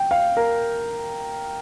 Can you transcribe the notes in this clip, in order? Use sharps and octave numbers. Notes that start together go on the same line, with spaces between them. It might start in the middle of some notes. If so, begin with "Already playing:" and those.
Already playing: G5
F5
A#4